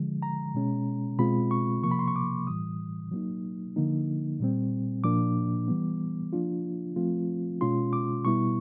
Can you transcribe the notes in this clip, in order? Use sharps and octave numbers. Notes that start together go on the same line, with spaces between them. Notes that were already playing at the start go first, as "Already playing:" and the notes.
Already playing: D3 F3 G#3
A#5
B2 G#3 C#4
B2 G#3 C4 F4 B5
C#6
C3 F3 A#3 C#6
B5
C6
C#6
D6
A2 E3 G3 D#6
F#3 A#3 D#4
D3 F3 A#3 D#4
A#2 G3 C4
A#2 F3 A#3 D4 D6
E3 G3 B3
F3 A#3 D4 F4
F3 A3 C4 F4
B2 G#3 C#4 F4 C6
D6
B2 G3 B3 E4 C#6